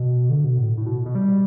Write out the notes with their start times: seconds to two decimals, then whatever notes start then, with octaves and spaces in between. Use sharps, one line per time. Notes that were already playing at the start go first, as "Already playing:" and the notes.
Already playing: B2
0.29 D3
0.44 B2
0.58 A2
0.77 A2
0.86 B2
1.06 B2
1.15 G3